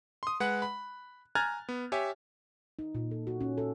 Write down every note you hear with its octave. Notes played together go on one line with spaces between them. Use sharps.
C6 D#6
G#3 B4 F#5 F#6
B5
G#5 A#5 F6 F#6 G#6 A6
B3
G4 C#5 E5 G#5
D#4
A#2
A4
F#4
C#4
A4